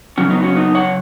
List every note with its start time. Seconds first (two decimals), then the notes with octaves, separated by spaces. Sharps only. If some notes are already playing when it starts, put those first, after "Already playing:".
0.18 C#3 F#3 C#4
0.30 B3 D#4
0.43 C#4 F#4
0.55 B3 D#4
0.75 C#5 F#5